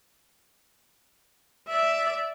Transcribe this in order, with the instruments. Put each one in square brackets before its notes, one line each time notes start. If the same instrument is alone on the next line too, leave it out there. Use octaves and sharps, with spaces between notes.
[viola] D5 E5